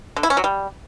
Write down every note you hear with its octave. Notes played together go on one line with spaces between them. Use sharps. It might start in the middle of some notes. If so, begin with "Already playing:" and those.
D3
E4
C#4
F#3
G3